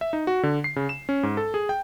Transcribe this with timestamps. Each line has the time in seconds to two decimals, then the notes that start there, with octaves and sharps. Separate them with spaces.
0.01 E5
0.13 D#4
0.27 F#4
0.43 D3
0.64 C7
0.76 C#3
0.89 E7
1.09 C#4
1.23 G#2
1.37 A4
1.54 G#4
1.69 G5